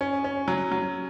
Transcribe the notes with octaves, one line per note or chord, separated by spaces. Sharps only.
C#4
C#4
F#3
F#3